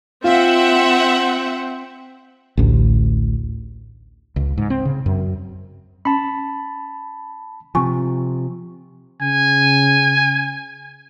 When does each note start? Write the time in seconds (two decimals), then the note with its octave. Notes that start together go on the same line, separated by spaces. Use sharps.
0.24 C4 F4 E5 F#5
2.57 A1 D2
4.36 C#2
4.58 G#2
4.70 C4
4.85 C#3
5.06 F#2
6.05 C#4 A5 B5
7.75 C3 F3 G#5 C#6
9.22 C#3 G#5